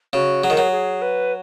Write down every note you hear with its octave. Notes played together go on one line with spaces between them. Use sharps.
C#3 F#4
F#3 G#4
D#3
F#3
G#4
B4